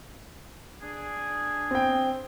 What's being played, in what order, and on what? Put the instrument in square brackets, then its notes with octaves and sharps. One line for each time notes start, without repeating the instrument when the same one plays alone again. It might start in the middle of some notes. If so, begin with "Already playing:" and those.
[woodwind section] D4 G#4
[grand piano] C4 G5